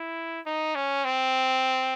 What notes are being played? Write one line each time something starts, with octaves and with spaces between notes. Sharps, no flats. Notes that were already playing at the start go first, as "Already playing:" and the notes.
Already playing: E4
D#4
C#4
C4